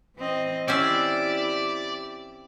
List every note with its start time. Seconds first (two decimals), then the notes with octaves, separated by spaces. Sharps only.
0.16 E3 C4 D#5
0.68 C4 C#4 E4 G4 D5 E5